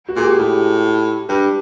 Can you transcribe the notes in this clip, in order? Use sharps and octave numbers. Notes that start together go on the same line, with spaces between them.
F#4
A#2 G#4
G4
A2 G4
G2 G4